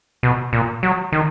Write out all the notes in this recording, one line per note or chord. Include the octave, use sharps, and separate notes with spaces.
B2
A#2
F#3
D#3